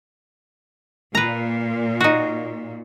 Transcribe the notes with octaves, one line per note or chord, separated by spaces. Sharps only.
A#2 B4 A#5
D#4 F#4